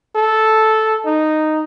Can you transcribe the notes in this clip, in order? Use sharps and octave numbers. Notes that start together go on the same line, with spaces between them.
A4
D#4